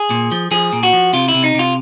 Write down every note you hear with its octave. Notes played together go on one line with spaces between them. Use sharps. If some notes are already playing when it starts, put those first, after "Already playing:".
Already playing: G#4
A#2
F3
F3 G#4
A#2
F#4
F3
C3 F4
E4
C3
D#4
C3 F4